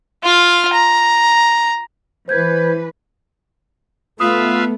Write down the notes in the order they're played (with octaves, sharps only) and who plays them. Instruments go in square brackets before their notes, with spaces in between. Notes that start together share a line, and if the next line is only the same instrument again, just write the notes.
[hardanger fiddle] F4 F5
A#5
[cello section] E3 B4 [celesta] C5 G6 G#6
[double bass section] A3 B3 [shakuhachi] F4 [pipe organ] B4 E5 F5 [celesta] D#6